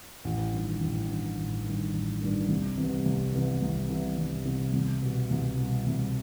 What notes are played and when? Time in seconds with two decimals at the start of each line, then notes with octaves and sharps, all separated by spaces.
0.25 A1
0.53 G2 D#3
0.81 A1
1.08 G2 D#3
1.37 A1
1.65 G2 D#3
1.93 A1
2.21 G2 D#3
2.48 C2
2.78 C3 E3 G3 B3
3.06 C2
3.33 C3 E3 G3 B3
3.62 C2
3.90 C3 E3 G3 B3
4.17 C2
4.45 C3 E3 G3 B3
4.73 C2
5.02 B2 G3
5.30 C2
5.58 B2 G3
5.86 C2